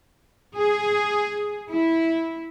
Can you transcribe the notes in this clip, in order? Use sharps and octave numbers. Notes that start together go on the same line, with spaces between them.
G#4
E4